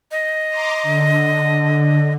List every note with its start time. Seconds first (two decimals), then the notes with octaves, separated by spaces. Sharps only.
0.11 D#5
0.48 A#5 C6 D6
0.83 D3